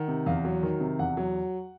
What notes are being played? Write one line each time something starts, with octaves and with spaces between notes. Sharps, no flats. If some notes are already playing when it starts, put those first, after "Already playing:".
Already playing: D#3 F#5
C3
E2 F5
F#3
D#3
C3
E2 F#5
F#3